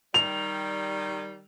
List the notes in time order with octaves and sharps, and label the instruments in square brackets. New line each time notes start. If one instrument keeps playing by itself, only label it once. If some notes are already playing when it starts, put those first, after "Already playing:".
[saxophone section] D#3 G3 [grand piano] F7